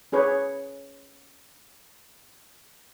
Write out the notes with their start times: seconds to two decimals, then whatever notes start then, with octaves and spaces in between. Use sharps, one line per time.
0.12 C#4 G#4 B4 C#5